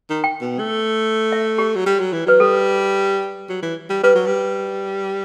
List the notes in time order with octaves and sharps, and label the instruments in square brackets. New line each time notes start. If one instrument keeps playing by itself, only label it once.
[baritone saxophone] D#3
[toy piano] G5
[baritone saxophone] B2
A3
[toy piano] E5
G4
[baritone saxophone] F#3
G3
F#3
E3
[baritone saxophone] F#3 [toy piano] B4
[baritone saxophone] G3 [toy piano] A4
[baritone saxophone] F#3
E3
G3
[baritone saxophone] G3 [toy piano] B4
[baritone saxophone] F#3
G3